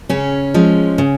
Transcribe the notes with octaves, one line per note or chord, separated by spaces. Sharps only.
C#3 C#4
F3 G#3
C#3